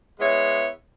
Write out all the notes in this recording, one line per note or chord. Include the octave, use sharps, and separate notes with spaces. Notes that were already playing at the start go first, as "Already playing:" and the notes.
G#3 B3 E4 C#5